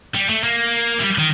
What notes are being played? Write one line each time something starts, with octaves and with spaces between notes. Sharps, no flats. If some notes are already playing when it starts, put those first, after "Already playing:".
G3
A3
A#3
G3
D#3